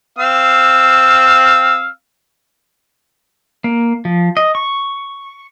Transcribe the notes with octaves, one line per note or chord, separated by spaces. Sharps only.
C4 F5 E6
A#3
F3
D#5
C#6